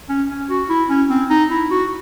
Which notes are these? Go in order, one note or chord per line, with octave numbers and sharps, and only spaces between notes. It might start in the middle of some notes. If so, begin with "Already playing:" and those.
C#4
C#4
F#4
E4
C#4
C4
D#4
E4
F#4